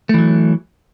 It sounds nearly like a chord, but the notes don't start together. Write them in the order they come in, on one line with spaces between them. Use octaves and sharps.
A3 E3 F#3